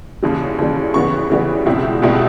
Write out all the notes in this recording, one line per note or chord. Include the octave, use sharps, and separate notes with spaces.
D#2 C#3 E3 G3
D#2 C#3 E3 G3
C#3 E3 G3 B3 C#6
C#3 E3 G3 B3
C#2 B2 G3 C4 E4
C#2 B2 G3 C4 E4